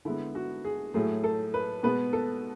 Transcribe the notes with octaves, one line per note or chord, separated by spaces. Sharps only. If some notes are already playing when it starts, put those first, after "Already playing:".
D3 G#3 B3 E4
F#4
G#4
A2 F#3 A3 G#4
A4
B4
B2 G#3 B3 B4
A4